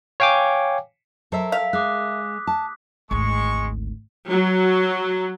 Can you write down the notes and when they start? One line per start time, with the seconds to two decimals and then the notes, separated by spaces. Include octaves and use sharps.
0.20 C#5 F5 G5 G#5 D6
1.32 F#3 A4 A#4 C5 E5
1.52 F5 B6
1.73 G#3 D6 D#6 F#6
2.47 A5
3.11 G#1 D2 G#3 C#6
4.30 F#3